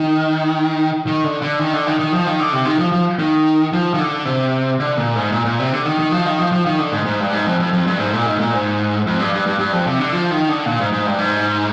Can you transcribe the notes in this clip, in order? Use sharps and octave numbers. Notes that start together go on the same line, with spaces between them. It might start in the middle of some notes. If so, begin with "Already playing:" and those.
Already playing: D#3
D#3
D3
D3
D#3
D3
D#3
D#3
F3
D#3
D3
C3
D#3
F3
F3
D#3
F3
D#3
D3
C3
D3
A#2
G#2
A#2
A#2
C3
D3
D#3
D#3
F3
D#3
F3
F3
D#3
D3
G#2
G#2
G2
G#2
F2
F2
F2
G2
G#2
A#2
G#2
A#2
G#2
F2
G2
G2
G2
G2
F2
C3
D3
F3
D#3
D3
A#2
G#2
G#2
G2
G#2